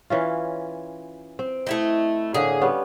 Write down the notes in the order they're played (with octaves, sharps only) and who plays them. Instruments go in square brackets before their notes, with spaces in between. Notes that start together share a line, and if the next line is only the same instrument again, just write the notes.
[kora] E3 C#4 F4
C4
[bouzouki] A3 E4 D#5 [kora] G5
[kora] A2 D3 A#3 [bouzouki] G#4
[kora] G3 B3 C#4